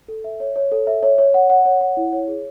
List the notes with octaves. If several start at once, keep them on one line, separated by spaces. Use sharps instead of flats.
A4
E5
C#5
C#5
A4
E5
C#5
C#5
F#5
F#5
C#5
F#5
E4
C#5
G#4